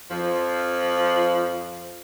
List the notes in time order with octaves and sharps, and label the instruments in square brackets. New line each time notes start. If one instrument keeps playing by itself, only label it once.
[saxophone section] F2 F3